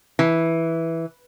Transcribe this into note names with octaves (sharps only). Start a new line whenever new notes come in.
E3